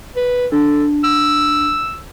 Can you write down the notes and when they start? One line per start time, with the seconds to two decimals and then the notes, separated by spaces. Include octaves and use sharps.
0.16 B4
0.52 D4 A4
1.04 E6